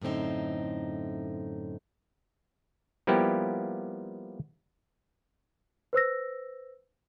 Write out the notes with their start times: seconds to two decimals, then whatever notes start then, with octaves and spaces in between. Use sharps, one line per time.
0.01 F#2 A2 D3 C4 D#4
3.07 F3 G3 A#3 B3 E4 G4
5.93 B4 C5 E6 A#6